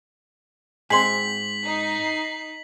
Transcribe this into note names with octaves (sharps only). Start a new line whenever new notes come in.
G#2 C4 G#4 C6 B6 F#7
D#4 C7